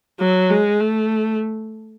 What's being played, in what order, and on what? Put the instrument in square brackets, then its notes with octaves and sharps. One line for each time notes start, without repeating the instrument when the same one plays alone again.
[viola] F#3
G#3
A3